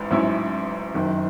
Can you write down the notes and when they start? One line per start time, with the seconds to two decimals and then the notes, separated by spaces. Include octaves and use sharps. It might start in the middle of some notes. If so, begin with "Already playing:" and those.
Already playing: A1 G#2
0.11 A1 G#2 F#3 C#4 E4
0.94 F#1 F#2 D#3